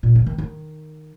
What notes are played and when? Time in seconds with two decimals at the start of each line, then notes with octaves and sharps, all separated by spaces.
0.03 A#2
0.15 C#3
0.26 D#3
0.38 D#3